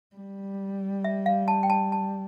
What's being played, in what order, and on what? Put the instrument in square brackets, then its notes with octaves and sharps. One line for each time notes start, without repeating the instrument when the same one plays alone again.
[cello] G3
[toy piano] E5
F5
A5
G5
A5
A5